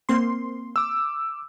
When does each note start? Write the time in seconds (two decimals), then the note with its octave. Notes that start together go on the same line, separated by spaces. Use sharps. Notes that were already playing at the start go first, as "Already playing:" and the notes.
0.09 A#3 C4 C6
0.76 D6 E6